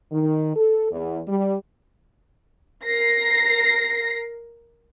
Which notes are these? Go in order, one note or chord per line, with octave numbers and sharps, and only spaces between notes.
D#3
A4
E2
G3
A#4 A#6 C7